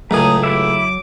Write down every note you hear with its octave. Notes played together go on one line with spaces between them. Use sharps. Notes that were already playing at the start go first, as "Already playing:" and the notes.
C#2 A2 F#3 A3 G#4 A#5 D#6
E4 E5 D6